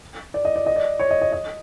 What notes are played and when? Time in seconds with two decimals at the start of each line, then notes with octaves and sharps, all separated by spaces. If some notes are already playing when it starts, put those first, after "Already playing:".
0.34 D5
0.45 D#5
0.56 D5
0.66 D#5
0.76 D5
0.99 C#5
1.11 D#5
1.22 D#5
1.32 D#5